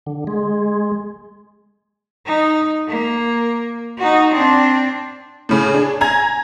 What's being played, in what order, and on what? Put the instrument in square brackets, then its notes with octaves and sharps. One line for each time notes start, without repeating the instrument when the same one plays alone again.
[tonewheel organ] D3
G#3
[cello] D#4
A#3
D#4 F#4
C4 D4
[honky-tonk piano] A2 C#3
D4 G#4
G#5 A#5 G#6